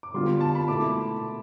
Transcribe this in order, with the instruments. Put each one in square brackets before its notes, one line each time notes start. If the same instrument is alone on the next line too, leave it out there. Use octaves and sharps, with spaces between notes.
[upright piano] D6
[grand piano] D3 G3 B3 F4 [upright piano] C6
[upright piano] A5
B5
[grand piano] B2 A3 E4 [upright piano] D6